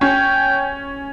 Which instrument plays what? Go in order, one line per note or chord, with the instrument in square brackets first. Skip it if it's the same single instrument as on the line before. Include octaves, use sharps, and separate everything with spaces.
[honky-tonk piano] C#4 [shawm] G5